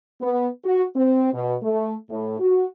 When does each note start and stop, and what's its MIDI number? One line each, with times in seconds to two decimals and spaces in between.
0.21 0.48 59
0.64 0.84 66
0.95 1.31 60
1.33 1.55 47
1.62 1.94 57
2.10 2.36 45
2.39 2.66 66